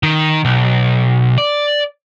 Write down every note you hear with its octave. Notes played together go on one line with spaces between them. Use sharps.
D#3
B1
D5